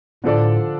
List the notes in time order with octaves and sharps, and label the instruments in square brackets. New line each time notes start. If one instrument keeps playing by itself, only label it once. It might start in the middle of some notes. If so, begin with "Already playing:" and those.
[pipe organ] A2 [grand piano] D3 F3 D4 A4 D5